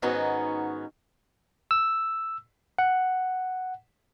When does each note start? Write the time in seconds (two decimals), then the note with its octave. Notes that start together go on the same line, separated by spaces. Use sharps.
0.02 G#2 D#3 B3 C#4 D#4 F#4
1.71 E6
2.79 F#5